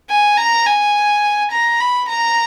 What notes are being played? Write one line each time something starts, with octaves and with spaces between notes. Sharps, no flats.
G#5
A#5
G#5
A#5
B5
A#5